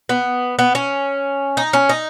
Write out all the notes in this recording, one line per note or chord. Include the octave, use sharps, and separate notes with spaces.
B3
B3
C#4
D#4
C#4
D#4